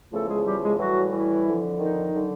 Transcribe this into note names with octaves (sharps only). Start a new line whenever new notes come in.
E2 C#3 F3 A3 A4
G#3 G#4
G3 G4
G#3 G#4
A2 E3 F#3 G3 F#4
E3 E4
F2 D3 F3
D#3 D#4
D3 F#3